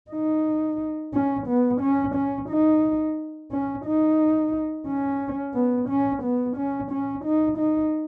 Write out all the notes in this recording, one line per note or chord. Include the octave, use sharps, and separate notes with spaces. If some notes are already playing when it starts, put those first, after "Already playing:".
D#4
C#4
B3
C#4
C#4
D#4
C#4
D#4
C#4
B3
C#4
B3
C#4
C#4
D#4
D#4